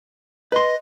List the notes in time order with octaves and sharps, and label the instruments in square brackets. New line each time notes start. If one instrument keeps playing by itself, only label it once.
[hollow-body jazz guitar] B4 C6 [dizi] D#5